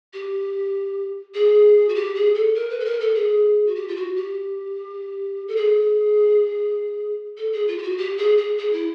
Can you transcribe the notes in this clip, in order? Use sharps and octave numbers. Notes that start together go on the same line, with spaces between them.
G4
G#4
F#4
G4
G#4
A4
A#4
B4
A4
A#4
A4
G#4
F#4
G4
F4
F#4
G4
A4
G#4
A4
G#4
F4
G4
F#4
G4
G#4
G#4
G#4
E4